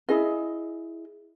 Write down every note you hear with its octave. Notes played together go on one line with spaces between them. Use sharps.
E4 G#4 D#5